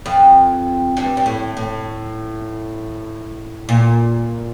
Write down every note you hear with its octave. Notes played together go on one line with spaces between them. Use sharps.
F2
G2
G2
A2
A2
A#2